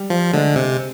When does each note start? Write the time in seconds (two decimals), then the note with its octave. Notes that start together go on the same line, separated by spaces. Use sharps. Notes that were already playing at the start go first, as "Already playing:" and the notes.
Already playing: G3
0.10 F3
0.33 D3 G#3
0.56 C3